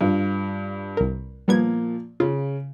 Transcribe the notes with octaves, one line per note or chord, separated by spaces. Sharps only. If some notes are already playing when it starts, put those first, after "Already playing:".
G2 F4
C2 A#4
A#2 F3 G3 A#3 B3 G#6
C#3 F4